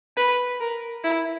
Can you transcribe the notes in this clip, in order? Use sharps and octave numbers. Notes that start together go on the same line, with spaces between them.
B4
A#4
E4